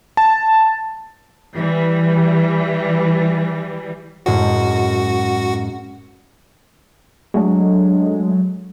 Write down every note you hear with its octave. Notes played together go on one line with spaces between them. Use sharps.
A5
E3 G3
F#2 A2 G#3 F#4
F#3 G#3 A3 D4